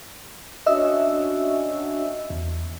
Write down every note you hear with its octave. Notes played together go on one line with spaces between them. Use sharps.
C#4 D4 F#4 D#5 E5 E6
E2